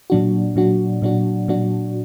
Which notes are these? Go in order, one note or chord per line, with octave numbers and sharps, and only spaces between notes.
A#2 F#3 D4 F#4
A#2 F#3 D4 F#4
A#2 F#3 D4 F#4
A#2 F#3 D4 F#4